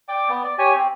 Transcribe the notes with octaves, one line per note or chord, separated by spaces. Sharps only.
D5 G5 D6
B3
D5
G4 C#5 G#5
C4